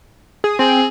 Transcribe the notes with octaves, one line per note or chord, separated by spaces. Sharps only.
G#4
C4 G#4